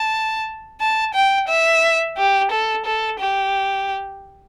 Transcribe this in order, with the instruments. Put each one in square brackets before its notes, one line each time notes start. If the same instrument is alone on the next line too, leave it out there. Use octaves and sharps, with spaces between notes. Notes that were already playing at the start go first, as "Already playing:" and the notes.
Already playing: [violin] A5
A5
G5
E5
G4
A4
A4
G4